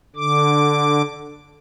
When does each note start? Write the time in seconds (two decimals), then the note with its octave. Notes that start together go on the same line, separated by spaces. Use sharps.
0.16 D3 D6